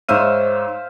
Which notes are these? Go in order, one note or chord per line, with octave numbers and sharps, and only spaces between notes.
G#2 C5 C#5 E5 F5 D#7